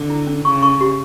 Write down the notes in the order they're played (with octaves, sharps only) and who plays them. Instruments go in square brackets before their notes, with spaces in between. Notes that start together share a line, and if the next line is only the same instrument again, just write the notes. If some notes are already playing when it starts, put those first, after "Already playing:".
Already playing: [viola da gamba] D3
[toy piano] E4
C#4
[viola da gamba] C#3 [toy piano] C#6
[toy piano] C#6
G4